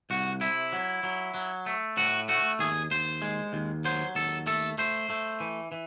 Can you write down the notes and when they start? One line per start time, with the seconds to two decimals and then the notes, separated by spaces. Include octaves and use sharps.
0.10 C2 F#4
0.41 C3 E4
0.73 F#3
1.03 F#3
1.34 F#3
1.66 A3
1.97 A2 F#4
2.29 A3 F#4
2.59 D#2 G#4
2.91 D#2 C5
3.22 G#3
3.53 D#2
3.85 F#3 C5
4.15 D#2 A4
4.47 A3 A4
4.78 A3 C5
5.10 A3
5.40 E3
5.72 E3